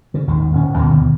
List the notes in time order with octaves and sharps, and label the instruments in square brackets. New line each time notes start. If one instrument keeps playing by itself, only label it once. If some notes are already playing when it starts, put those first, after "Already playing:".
[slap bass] C#3
G#1 D#2 D#3
D1 C#4
D2 G2 B2 D#3